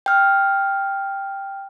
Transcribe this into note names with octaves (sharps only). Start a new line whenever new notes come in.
G5 F6